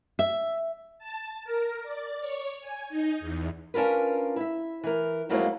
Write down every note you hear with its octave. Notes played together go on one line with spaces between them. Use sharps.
E5
A5
A#4
D5
C#5
G#5
D#4
E2
C#4 D4 F4 A#4 B4
E4 E5
E3 A#4
F2 F#3 G#3 A#3 D#4 E4